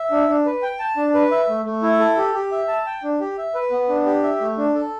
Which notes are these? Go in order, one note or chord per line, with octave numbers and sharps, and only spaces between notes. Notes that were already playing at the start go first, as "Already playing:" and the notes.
Already playing: E5
D4
D4
B4
G5
A5
D4
B4
E5
A3
A3
E4
A4
G4
G4
E5
A5
G5
D4
G4
E5
B4
B3
D4
G4
E5
A3
D4
A4